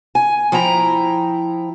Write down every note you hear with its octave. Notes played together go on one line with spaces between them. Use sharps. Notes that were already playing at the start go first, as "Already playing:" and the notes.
G#5
F3 E4 G5 A#5